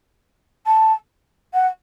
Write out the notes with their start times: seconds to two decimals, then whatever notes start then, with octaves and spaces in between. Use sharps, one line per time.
0.66 A5
1.54 F#5